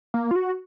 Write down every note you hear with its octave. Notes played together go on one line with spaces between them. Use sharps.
A#3
F4
F#4